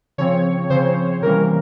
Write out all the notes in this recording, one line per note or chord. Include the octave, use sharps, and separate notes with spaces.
C#3 F3 C4 C#5
C#3 F3 C4 C5
C3 E3 G3 A#3 C#4 A#4